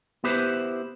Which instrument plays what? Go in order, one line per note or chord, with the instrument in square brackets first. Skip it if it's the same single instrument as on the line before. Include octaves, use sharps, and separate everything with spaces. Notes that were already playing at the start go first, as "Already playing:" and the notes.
[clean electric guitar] B3 E4 G4 B4 C5